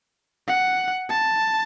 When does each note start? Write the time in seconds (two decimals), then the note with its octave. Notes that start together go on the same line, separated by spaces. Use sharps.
0.48 F#5
1.09 A5